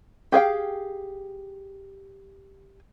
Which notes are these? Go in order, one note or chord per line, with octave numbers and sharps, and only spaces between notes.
G4 G#4 F5 G5